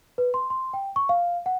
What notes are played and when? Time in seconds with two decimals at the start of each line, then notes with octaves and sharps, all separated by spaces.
0.18 B4
0.34 C6
0.50 C6
0.74 G5
0.96 C#6
1.09 F5
1.46 F#5